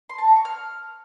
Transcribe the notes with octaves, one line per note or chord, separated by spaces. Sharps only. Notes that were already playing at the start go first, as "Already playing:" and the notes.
C6
A5
A#5
C#6
F6